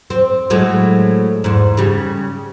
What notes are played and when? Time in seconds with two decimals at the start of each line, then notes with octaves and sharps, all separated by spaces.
0.10 C4
0.50 A2 F#3 G#3
1.44 E2 G#2
1.77 C#3 G3